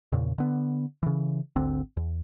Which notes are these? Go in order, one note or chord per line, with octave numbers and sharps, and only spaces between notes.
E2 A#2 C#3
D3 B3
C#3 E3
G#1 D2 D3 C4
E2